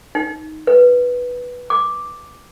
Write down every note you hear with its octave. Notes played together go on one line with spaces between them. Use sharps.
D#4
B4
D6